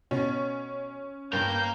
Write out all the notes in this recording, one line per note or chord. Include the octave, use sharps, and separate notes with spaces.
B2 C#4
G2 A#3 A#4 G6